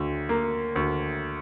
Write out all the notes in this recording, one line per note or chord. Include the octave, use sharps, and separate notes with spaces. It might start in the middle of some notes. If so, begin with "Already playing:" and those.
Already playing: D2
A#3
D2